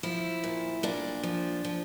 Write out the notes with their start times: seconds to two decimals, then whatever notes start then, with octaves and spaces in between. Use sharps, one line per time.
0.03 F3 E4
0.44 A#2
0.83 A#2 D4
1.23 F3
1.65 F3